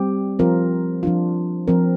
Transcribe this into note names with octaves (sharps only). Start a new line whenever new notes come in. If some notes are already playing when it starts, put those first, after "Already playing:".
Already playing: G3 C4 G4
F3 C4 F4 A#4
F3 D4 F4
F3 C4 A#4